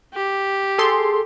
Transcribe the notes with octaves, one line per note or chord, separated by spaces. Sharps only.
G4
G#4 A4 C6